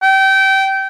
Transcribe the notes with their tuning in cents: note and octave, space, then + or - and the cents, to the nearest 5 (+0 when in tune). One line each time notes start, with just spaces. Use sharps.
G5 -25